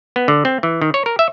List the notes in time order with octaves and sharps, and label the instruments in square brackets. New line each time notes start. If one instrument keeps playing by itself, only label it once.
[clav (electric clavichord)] B3
D3
C4
E3
D#3
C#5
A#4
E5